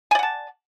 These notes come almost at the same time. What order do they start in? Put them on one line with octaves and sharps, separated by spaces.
G#5 D5 F#5 A5